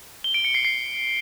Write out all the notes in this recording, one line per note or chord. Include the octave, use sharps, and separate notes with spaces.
G7
D7
C#7
C7
C7